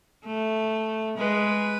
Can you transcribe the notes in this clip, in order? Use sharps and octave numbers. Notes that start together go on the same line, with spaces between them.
A3
G#3 B4